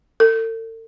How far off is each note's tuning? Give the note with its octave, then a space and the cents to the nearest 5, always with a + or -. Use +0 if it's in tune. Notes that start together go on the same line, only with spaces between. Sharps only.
A4 +40